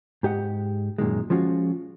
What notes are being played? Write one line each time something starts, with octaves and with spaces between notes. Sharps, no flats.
G#2 G4 D#5 F#5
F#2 A#2 D#3 G#3
F3 G#3 C#4 F4 F#4